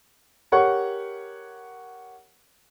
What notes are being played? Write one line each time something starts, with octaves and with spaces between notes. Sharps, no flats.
G4 A#4 C#5 F#5 C#6